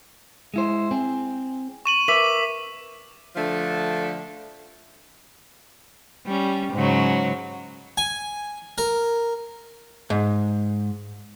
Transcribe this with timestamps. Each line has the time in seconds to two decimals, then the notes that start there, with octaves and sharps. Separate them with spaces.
0.54 G#3 E4 C5
0.91 C4 G#4
1.86 C#6 D#7 F#7
2.08 A#4 B4 E5 D6 B6 F#7
3.36 D3 F3 A3 D4 A4
6.26 G3 C#4
6.73 G#2 C#3 F#3
7.97 G#5
8.78 A#4
10.10 G#2